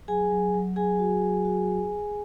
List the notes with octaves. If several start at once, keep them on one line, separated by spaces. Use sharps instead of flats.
F#3 G#4 G#5
F#3
F#3
F#3 G#4 G#5
F#4
F#3
F#4